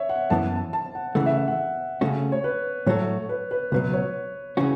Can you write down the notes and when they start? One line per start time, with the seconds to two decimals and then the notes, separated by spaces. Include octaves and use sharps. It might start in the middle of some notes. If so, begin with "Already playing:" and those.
Already playing: C#5 E5
0.09 F#5
0.30 F#2 E3 B3 A5
0.56 A5
0.73 A5
0.95 F#5
1.15 C#3 E3 A3 F#5
1.26 E5
1.37 E5
1.48 F#5
2.01 C#3 A3 C#4 F#4
2.32 C#5
2.44 B4
2.86 A2 F#3 A3 F#4 A4 C#5
3.29 B4
3.51 B4
3.72 C#2 B2 F#3 B4
3.93 C#5
4.57 C#3 E3 C#4 F#4